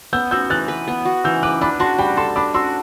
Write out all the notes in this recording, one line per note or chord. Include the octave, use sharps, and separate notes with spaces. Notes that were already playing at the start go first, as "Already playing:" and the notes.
B3 E6 G6
F#4 E6 G6
E3 F#6 A6
B4
B3
F#4
E3 E6 G6
B4 D6 F#6
D4 B5 D6
F#4 A5 C6
G3 G5 B5
A4 A5 C6
D4 B5 D6
F#4 C6 E6